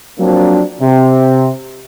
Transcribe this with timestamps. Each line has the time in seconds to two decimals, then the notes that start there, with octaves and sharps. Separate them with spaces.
0.20 F3 F#3 A#3 C4 D4
0.81 C3